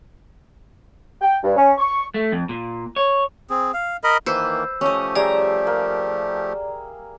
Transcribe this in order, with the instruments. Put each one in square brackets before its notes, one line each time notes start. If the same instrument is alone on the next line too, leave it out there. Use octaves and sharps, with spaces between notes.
[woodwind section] G5
G2
C#4
C#6
[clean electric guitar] A3
F2
A#2
C#5
[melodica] C4 G#4
F5
A#4 D#5 B5
[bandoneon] D#3 E3 A#3 [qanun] B4 C5 [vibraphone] E6
[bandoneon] F3 A3 G4 [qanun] C#4 D#5
[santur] G3 G#4 E5 [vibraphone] D5 [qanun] A#5
[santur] A#3